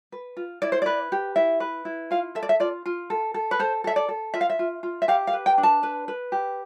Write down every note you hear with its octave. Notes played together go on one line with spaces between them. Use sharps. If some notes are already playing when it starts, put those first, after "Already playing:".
B4
F4
E4 D5
C5
B4 D5
G4
E4 E5
B4
E4
F4 F5
A4 E5
D5
E5
F4 D5
F4
A4
A4
B4
A4 C5
A4 E5
D5
A4
F4 E5
F5
E5
F4
F4
E5
G4 F5
F5
B4
G5
D4
A5
B4
B4
G4